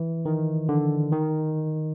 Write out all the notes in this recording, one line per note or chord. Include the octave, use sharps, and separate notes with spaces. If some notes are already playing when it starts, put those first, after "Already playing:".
Already playing: E3
D#3
D3
D#3